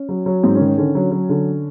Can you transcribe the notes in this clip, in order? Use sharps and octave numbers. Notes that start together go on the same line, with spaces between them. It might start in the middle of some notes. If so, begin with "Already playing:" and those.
Already playing: C#4
F#3
F#3
G#2 C4
C#4
D#3
C#4
D3 C#4
F#3
F#3
D3